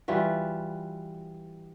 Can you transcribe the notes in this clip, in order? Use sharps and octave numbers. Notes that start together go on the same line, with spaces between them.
E3 G3 F4 F#4